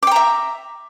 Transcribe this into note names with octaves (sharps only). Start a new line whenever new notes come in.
E5 G5 A#5 D6